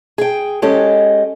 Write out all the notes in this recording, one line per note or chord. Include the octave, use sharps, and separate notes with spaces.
G#4 G5
G#3 C#4 G4 A4 D#5